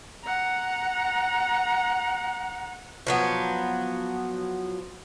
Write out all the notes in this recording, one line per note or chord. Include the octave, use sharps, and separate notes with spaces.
F#5 A#5
F3 F#3 B3